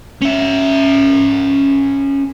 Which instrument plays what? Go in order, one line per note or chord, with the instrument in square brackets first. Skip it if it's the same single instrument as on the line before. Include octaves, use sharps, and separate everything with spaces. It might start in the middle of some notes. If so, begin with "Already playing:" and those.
[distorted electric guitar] C#4 E5